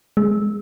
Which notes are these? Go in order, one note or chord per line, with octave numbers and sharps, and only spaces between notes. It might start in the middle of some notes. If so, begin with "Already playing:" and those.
G#3